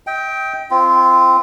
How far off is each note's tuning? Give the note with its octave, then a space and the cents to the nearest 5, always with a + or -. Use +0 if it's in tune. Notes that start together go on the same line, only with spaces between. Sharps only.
D#5 +40 G5 +0
C4 +0 F4 -25